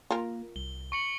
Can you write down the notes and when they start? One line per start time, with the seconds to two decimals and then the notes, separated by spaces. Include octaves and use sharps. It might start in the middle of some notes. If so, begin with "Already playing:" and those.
0.11 A#3 F4 A#4
0.56 C2 G7
0.92 C#6 C#7 F#7